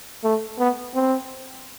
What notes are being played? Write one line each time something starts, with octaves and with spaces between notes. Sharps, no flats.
A3
B3
C4